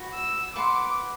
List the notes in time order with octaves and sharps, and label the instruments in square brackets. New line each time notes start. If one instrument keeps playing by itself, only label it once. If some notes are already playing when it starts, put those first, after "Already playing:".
Already playing: [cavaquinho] F#4 B4 F#5
[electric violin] E6
[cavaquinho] B4 F#5 C6 [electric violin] D6